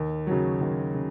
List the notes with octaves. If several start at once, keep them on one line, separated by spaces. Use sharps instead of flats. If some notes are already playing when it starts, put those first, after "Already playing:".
Already playing: D#2
C#3 F#3
D#2
C#3